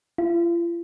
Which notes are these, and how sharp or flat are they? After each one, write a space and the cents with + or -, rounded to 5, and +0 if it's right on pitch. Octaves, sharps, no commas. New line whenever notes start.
F4 -45